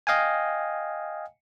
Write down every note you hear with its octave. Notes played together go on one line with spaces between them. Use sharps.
D#5 F5 G5 G#5